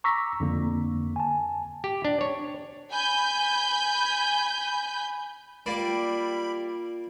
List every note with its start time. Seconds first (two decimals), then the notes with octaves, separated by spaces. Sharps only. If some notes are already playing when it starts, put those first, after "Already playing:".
0.04 A#5 C#6 D6 E6 A#6 B6
0.40 F2 D3 A#3
1.16 G#5 A5
1.84 G4
2.05 D4
2.21 C#5
2.92 G#5 B5 G6
5.66 G3 A#3 F4 D5 B5